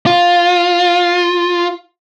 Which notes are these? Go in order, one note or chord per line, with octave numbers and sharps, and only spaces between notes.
F4